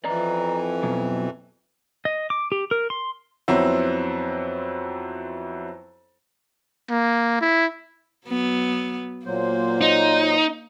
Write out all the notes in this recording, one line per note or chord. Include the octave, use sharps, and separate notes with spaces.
F2 E3 D5 D#5 A#5
B2 F#3
D#5
D6
G4
A#4
C6
F2 F#3 B3 C4 E4
A#3
E4
F#3 B3
A#2 F#3 A#3 C5
D#4